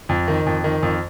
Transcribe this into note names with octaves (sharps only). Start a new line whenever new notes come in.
F2
D#3
F2
D#3
F2